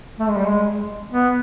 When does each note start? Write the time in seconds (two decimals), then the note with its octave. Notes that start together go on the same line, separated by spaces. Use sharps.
0.19 A3
0.29 G#3
0.38 G3
0.48 G#3
1.12 B3